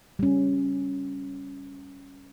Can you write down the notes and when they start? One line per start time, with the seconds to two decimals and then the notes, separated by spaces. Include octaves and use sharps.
0.19 G3 C#4